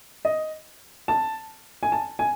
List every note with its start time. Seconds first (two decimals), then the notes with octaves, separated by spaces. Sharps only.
0.25 D#5
1.08 A5
1.83 G#5
1.92 A5
2.19 G#5